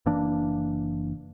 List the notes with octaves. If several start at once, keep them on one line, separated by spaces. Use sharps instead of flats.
F#1 E3 A#3 D4